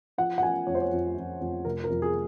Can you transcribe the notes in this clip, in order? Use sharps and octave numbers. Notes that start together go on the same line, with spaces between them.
F3 F#5
F#5
F3 G#5
F2 C#5
C5
C#5
F2
F2
F2
F1 A#4
A#4
F2
G#4